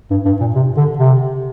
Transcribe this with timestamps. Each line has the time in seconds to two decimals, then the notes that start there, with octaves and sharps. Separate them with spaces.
0.11 G2
0.25 G2
0.40 A#2
0.55 C3
0.77 D3
0.98 C3